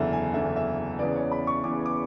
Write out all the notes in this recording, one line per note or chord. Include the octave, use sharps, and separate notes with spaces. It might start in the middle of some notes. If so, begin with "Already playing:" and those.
Already playing: F#1 E2 D3 E5
G#5
F#1 E2 D3 E5
E5
E2 C#3 E3 B3 D5
C#5
B5
C#6
E2 C#3 E3 B3 D6
D6